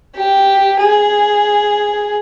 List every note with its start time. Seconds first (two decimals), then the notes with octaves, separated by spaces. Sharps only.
0.16 G4
0.80 G#4